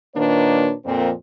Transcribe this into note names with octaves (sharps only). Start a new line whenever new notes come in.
A#2 D#3 A#3 D4 B4 C#5
F2 A#2 C4